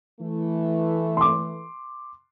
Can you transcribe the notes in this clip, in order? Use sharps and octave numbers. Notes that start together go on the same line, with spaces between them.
E3 A3
C6 D6